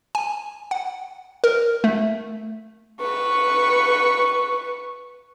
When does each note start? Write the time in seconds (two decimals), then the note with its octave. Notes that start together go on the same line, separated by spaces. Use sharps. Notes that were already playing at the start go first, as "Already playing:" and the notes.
0.15 G#5
0.71 F#5
1.44 A#4
1.84 A3
3.01 B4 C#6